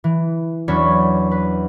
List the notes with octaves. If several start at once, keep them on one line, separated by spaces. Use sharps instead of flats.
E3
E2 F#3 C#4 D4 C#5 B5
B4